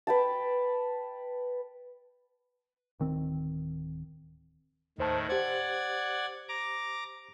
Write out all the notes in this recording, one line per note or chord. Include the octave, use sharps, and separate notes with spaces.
B4 G5 A5
D1 D#3 C4
D#2 A2 D#3 C5 A5
G4 C5 D5 F#5 G#6
A#5 D6